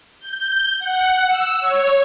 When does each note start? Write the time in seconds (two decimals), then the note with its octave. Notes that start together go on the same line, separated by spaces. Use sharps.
0.20 G6
0.79 F#5
1.26 E6
1.60 C#5